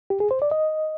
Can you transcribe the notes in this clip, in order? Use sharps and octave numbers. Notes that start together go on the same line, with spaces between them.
G4
G#4
C5
D5
D#5